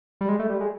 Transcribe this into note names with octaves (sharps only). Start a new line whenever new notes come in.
G3
G#3
A3
G3
G#3